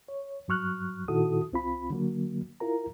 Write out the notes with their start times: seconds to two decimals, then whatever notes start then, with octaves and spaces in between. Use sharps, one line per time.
0.08 C#5
0.48 G2 F#3 C#6 F6 F#6
1.08 A#2 D#3 E4 F#4 A4 D#6
1.52 C2 C4 F4 B5
1.90 D3 F#3 A#3
2.60 E4 F4 A#4 A#5